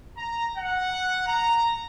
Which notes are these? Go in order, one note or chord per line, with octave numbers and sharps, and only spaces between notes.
A#5
F#5
A#5